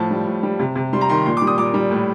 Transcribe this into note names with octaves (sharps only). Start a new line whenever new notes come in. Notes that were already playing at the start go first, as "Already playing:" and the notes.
Already playing: A2 F3 A5
G3
A2
G3
C3
C3
G3 C6
A#5
D#3 C6
A#2 C6
G3 D6
D#6
A#2 D6
G3
A2